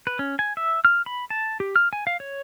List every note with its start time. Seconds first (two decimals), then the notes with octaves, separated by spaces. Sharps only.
0.07 B4
0.19 C#4
0.39 G#5
0.57 E5
0.85 F6
1.06 B5
1.30 A5
1.60 G4
1.76 F6
1.93 G#5
2.07 F5
2.20 C#5